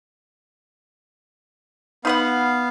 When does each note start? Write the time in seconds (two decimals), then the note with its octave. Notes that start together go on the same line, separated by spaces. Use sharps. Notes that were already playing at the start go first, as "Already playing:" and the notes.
2.05 B3 D#4 B4 F5 F#5